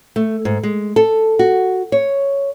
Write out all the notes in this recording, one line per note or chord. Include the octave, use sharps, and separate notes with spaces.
A3
G#2
G#3
A4
F#4
C#5